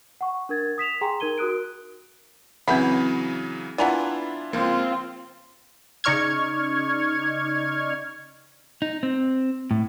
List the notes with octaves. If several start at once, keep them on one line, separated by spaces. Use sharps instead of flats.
F#5 C#6
D4 A#4 G#6 A6
D#6 B6 E7 F7
G#4 G5 G#5 A#5 C6
D#4 A#4 G#6 D#7 G7
F#4 A#4 D#6 F#6 D7
C#3 E3 F#3 B3 C4 E5 G#5 B5
E3 B3 D4 E4 F4 D5 G#5 A#5
C#2 F3 A#3 C4 F4
C#3 D#4 D5 C#6 F6 G#6
D#4
C4
A2